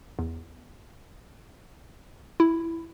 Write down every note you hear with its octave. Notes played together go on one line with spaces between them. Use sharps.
E2
E4